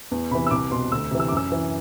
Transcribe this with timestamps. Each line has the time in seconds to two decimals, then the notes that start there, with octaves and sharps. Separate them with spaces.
0.11 E2
0.31 C3 E3 B5
0.47 E6
0.51 C2 D6
0.71 B2 C6
0.92 D2 E6
1.11 C3 E3
1.20 E6
1.28 D6
1.32 F#2 E6
1.52 E3